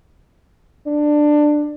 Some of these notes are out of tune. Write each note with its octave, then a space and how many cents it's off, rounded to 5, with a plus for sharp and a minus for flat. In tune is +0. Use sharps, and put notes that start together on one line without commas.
D4 +15